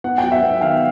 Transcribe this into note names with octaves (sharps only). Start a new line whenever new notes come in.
B3 F#5
G5
F#3
E5 F#5
B3
D#3 F5 G5